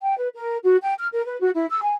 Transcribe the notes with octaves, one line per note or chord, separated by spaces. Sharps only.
G5
B4
A#4
F#4
G5
F6
A#4
B4
F#4
E4
E6
G#5